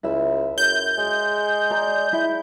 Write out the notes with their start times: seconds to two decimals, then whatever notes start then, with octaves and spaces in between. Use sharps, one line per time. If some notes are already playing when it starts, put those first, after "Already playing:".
0.03 C#2 E4 E5
0.58 F#2 G6
0.98 G#3
1.71 D5 A#5
2.13 E4